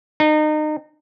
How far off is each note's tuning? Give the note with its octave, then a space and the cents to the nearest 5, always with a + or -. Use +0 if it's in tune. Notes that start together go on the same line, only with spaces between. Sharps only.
D#4 -30